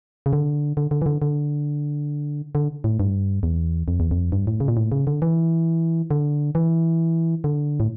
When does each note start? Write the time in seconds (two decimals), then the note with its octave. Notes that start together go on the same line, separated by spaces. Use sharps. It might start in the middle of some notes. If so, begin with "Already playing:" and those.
0.26 C#3
0.33 D3
0.77 D3
0.91 D3
1.02 E3
1.06 D3
1.22 D3
2.55 D3
2.84 A2
3.00 G2
3.43 E2
3.88 F2
4.00 E2
4.11 F2
4.32 G2
4.47 A2
4.60 C#3
4.68 A#2
4.77 A2
4.92 C#3
5.07 D3
5.22 E3
6.11 D3
6.55 E3
7.44 D3
7.80 A2